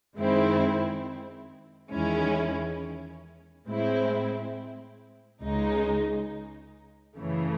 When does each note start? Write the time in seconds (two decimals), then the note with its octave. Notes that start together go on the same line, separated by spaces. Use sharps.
0.17 F#2 D#3 G#3 C4 E4
1.92 E2 D#3 G#3 C#4 E4
3.66 A2 G#3 C4 E4
5.40 C#2 C#3 G#3 D#4
7.15 F#2 C#3 E3 A3